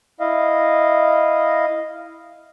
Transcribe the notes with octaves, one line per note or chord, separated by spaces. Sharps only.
E4 D#5 F5